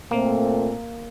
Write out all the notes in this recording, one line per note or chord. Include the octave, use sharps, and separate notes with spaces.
A#2 A3 A#3 C4